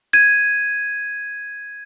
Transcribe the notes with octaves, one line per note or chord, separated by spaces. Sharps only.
G#6 D#7